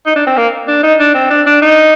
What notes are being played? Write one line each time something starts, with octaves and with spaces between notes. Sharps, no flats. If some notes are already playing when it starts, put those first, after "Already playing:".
D#4
D4
C4
A#3
D4
D#4
D4
C4
D4
D4
D#4